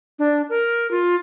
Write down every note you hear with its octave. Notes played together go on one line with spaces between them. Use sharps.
D4
A#4
F4